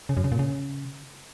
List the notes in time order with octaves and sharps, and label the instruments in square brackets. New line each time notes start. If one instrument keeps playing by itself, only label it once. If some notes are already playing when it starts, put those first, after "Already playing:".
[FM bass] C#3
F#2
C#3
A#2
C#3